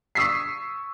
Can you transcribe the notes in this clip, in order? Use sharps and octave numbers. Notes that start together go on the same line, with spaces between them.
C#6 D#6 E6 B6 C7